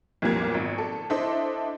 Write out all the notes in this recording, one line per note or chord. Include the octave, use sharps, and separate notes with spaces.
B1 F2 A#2 G3 A#3 G#6
G#1
A4
D4 E4 A4 C5 D#5 E5